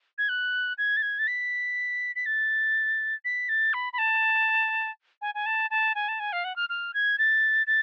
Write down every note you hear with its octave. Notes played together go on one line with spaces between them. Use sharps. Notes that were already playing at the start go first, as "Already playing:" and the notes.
G#6
F#6
G#6
A6
G#6
A6
B6
B6
A6
B6
A6
B5
B5
A5
G#5
G#5
A5
A5
G#5
A5
G#5
F5
F#5
F6
F6
G#6
A6
A6